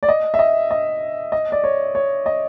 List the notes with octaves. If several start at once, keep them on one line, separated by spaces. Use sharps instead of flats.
D5
D#5
E5
D#5
D#5
D#5
D5
C#5
C#5
D#5